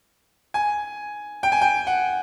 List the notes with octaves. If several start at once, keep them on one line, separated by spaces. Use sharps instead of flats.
G#5
G5
G#5
G5
F#5